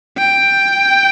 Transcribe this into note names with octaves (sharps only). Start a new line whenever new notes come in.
G5